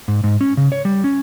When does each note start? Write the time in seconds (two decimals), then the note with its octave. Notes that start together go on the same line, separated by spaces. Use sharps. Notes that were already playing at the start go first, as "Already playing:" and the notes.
0.08 G#2
0.23 G#2
0.41 C#4
0.57 C#3
0.72 C#5
0.85 G3
1.04 C#4